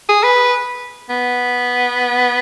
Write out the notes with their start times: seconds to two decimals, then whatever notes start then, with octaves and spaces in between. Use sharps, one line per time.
0.09 G#4
0.24 B4
1.10 B3